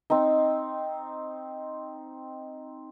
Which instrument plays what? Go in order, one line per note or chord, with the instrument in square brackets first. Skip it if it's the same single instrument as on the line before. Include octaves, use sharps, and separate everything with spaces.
[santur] C4 D#4